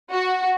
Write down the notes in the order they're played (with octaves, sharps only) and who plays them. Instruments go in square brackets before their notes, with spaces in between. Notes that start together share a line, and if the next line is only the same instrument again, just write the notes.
[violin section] F#4